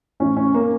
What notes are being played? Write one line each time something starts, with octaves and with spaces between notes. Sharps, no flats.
A2 E3 C#4
C#4
A#3